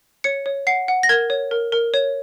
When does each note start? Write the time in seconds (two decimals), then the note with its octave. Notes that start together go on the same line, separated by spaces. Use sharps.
0.24 C#5 C#7
0.46 C#5
0.67 F#5 C7
0.88 F#5
1.03 A#6
1.09 A#4 G#6
1.30 C#5
1.51 A#4
1.72 A#4
1.94 C#5